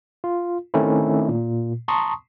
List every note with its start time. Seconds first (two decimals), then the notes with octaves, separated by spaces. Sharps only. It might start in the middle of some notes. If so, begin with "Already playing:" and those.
0.24 F4
0.74 D#3 A3 C4 C#4 D#4 E4
1.29 A#2
1.88 A5 A#5 C6 C#6 D#6